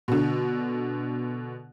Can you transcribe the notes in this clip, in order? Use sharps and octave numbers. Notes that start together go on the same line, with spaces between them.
B2 D3